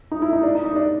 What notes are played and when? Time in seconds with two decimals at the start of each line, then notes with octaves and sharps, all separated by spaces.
0.12 D#4
0.22 E4
0.33 D#4
0.43 D4
0.55 D#4
0.65 D#4
0.76 D4